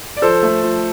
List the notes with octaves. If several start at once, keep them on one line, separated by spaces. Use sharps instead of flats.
D5
F3 A4 C5
A3
F3